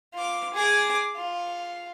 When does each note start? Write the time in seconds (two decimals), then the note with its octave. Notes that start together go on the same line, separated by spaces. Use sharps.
0.14 F4 D6
0.54 G#4 D6
1.16 F4